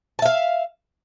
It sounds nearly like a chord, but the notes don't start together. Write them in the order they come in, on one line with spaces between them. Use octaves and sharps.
A5 E5 F5